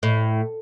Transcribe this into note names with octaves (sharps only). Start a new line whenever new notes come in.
A2